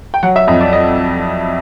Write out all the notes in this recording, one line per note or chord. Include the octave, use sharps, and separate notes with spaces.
G5
F#3 F#5
E5
F2 D#5
D5
D#5